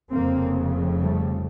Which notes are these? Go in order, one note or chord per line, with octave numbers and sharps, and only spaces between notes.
F1 F2 C#3 A#3 C4
G3 A3